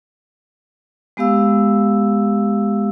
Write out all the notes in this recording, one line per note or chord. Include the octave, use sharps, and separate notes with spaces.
G#3 B3 G4 F5 E6